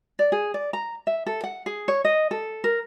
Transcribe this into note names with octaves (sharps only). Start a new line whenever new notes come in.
D5
G#4
D5
A#5
E5
A4
F#5
G#4
C#5
D#5
A4
A#4